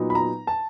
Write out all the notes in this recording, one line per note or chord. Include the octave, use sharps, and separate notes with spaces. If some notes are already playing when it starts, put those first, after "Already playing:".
Already playing: A#2 F#3 B3 D#4
B5
A#5
A5